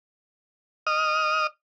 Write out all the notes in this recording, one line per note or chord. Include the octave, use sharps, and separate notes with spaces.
D#5 D#6 F6